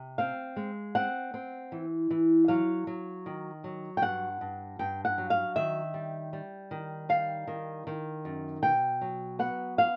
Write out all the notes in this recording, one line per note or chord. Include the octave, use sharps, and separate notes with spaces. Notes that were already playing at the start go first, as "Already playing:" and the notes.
Already playing: C3
C4 F5
G#3
C4 F#5
C4
E3
E3
F#3 F5
F#3
D#3
F#3
G5
G2 F#5
G2
G2 G5
F#5
F#3
F5
D#3 E5
G3
G3
D#3
G3 F5
D#3
D#3
F#2
B2 G5
F#3
B3 F#5
F5